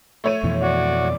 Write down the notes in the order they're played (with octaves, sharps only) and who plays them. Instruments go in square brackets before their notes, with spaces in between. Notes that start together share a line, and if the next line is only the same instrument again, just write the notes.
[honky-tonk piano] A3 C#5 D#7
[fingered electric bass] F2 B2 E3
[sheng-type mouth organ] F#4 [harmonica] D5